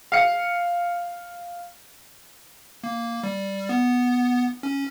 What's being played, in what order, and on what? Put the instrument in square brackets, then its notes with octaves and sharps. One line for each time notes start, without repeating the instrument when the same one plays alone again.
[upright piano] F5 C#7
[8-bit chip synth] A#3
G3
B3
C#4